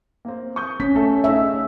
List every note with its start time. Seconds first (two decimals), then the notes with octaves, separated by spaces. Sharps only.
0.25 A#3 C4
0.56 C#6 D#6 G6
0.80 C#4 B6
0.95 A3 A4 E5
1.24 C#3 A3 D#4 E5